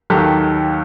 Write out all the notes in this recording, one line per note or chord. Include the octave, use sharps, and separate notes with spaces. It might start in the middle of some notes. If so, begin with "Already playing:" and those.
D#2 D#3 F#3 G4 A4